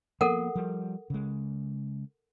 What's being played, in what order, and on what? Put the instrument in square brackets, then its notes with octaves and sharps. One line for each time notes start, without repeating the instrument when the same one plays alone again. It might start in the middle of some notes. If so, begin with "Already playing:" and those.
[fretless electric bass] F3 A#3 B3 [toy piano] A4 A#4 F#5
[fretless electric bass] F3 G3
C#3 G#3